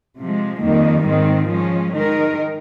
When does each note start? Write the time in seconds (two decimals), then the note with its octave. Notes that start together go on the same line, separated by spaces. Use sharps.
0.21 C3 F3 G#3
0.63 F2 D#3 G3 A#3 D#4
1.07 G#2 D#3 G#3 C4
1.50 F3 G#3 C#4
1.94 D#3 G#3 D#4 A#4